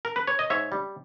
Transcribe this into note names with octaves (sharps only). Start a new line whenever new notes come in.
A#4
B4
C#5
D#5
G#2 C#5 E5
G3